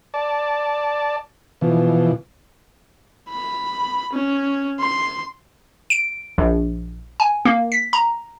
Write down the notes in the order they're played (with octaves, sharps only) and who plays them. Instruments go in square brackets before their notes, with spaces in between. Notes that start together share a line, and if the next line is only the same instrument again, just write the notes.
[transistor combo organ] D5 A5
B2 E3 F3
[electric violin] B5
C#4
C6
[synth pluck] D7
A#1
G#5
A#3
B6
A#5